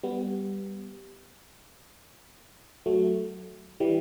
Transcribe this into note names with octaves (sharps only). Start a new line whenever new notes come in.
G3 B3
F#3 A3
E3 G3